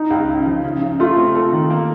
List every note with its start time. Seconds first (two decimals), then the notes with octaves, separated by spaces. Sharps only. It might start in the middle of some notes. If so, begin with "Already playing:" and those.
Already playing: D#4
0.10 C#2
0.29 C#3
0.46 F3
0.64 C#3
0.82 C#3
1.00 A3 F4
1.17 C4
1.35 A4
1.53 D#3
1.70 A#3